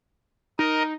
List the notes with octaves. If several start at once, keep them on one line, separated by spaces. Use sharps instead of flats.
D#4 A#4 D#5